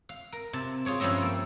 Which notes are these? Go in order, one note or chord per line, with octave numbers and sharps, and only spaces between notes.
F5
A#4
C3 A5
F4 G#4 C#5 D5
G2 F3 G3 C#4 E5 A#5
A#3 A4